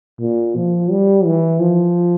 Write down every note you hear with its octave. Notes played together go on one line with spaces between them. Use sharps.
A#2
F3
G3
E3
F3